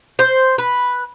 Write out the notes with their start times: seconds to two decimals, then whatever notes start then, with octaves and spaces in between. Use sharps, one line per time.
0.19 C5
0.58 B4